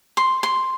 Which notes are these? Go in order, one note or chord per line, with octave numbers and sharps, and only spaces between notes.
C6
C6